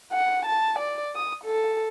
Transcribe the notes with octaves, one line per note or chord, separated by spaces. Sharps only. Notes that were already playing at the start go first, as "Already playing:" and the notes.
F#5
A5
D5
D#6
A4